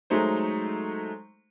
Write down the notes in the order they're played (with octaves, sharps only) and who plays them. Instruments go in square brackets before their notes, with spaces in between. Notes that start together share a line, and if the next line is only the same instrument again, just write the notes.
[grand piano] F#3 G#3 A3 D#4 C5